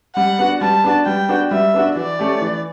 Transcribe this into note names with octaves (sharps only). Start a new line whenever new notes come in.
G3 F#5
B3 D4 F#4
G3 A5
B3 D4 F#4
G3 G5
B3 D4 F#4
G3 E5
B3 D4 F#4
E3 D5
A3 C#4 G4
E3